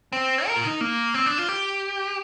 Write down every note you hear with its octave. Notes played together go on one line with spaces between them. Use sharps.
C4
A#4
F4
D#4
A#3
C4
D4
F4
G4